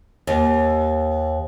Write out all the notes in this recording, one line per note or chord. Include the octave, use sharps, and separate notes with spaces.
D#2